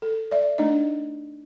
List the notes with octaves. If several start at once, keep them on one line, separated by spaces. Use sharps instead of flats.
A4
D5 E5
A3 D4 D#4 D#5